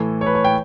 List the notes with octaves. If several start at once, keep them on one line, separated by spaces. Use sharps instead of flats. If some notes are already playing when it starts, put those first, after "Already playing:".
Already playing: A2 E3 A4
C#5
B4
C#5
G5